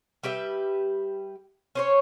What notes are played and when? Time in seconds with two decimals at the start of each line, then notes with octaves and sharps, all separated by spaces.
0.23 G3 G4 B4 E5
1.75 C#4 C5 C#5